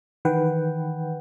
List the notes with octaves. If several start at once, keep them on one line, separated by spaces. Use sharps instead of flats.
D#3 E3 B4 F#5 G5